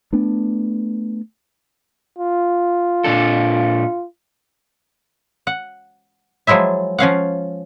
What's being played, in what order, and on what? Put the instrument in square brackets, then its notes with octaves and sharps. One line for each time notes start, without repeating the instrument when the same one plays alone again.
[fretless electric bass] A3 B3 D4
[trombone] F4
[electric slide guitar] A#2 D4 A4
[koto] F#5
F3 F#3 G#3 E4 E5
F3 C#4 F5 F#5